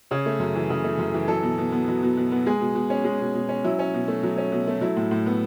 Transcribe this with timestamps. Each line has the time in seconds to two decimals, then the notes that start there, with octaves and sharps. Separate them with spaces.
0.11 C#3 C#5
0.26 A3
0.40 F#2
0.55 E3
0.70 C#3
0.84 A3
0.98 F#2
1.14 E3
1.28 F#3 A4
1.43 B2
1.58 B2
1.72 B3
1.88 F#3
2.03 B2
2.17 B2
2.32 B3
2.46 G#3 G#4
2.61 B2
2.75 B2
2.90 C#4
3.05 G#3
3.20 B2
3.35 B2
3.49 C#4
3.64 F#3 E4
3.79 C#4
3.94 B2
4.08 A3
4.23 F#3
4.37 C#4
4.52 B2
4.67 A3
4.81 F#3 E4
4.97 A2
5.11 A2
5.26 B3